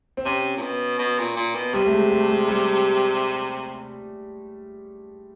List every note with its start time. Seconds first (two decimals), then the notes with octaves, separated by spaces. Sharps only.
0.17 C4
0.25 C3 C#4
0.57 A#2
0.62 B2
0.99 B2
1.19 A#2
1.37 A#2
1.55 B2
1.74 C3 G3
1.86 A3
1.92 G#3
2.11 A3
2.30 G#3
2.48 G3